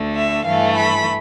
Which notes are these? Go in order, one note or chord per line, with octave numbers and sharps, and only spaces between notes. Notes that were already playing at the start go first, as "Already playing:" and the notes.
Already playing: D2 D3 A3
E5
G2 E3 A3 F5
B5